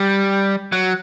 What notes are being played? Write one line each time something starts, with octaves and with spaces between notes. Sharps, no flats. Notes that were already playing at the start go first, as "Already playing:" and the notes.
Already playing: G3
F#3